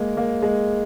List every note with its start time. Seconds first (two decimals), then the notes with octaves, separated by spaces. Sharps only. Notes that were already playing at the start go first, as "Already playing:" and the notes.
Already playing: G#3 A#3
0.17 A#3
0.42 G#3